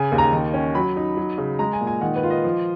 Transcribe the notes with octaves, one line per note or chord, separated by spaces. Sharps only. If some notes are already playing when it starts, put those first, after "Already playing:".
Already playing: C#3 G#5
D#2
A#5
D#3
C#4
F#3 B5
D#4
F#3
C#3
G#3 A#5
G#5
A#2
G#5
D#3 F#5
B4
F4
D#5
F3